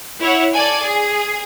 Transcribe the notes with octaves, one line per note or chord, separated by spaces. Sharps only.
E4 C#5 F#5
A4 D5 G#5
G#4